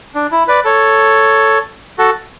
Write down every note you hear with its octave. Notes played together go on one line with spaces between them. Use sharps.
D4
E4
B4 D5
A4 C#5
F#4 A4